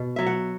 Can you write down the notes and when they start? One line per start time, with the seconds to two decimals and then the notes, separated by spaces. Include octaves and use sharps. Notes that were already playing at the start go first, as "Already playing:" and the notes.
Already playing: B2
0.16 F#3 E5
0.26 F#5